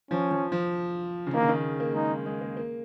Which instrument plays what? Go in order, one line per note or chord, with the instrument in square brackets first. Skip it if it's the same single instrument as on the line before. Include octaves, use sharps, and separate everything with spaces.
[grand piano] F3 [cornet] C#4
[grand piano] F3
F3
C#3
[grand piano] D#3 [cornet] A#3
[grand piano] C#3
D#3
A#3
[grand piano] G#3 [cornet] D#4
[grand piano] G#3
A#3
A#3